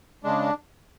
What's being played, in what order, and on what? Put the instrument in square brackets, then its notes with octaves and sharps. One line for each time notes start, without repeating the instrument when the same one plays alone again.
[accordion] C#3 G#3 D4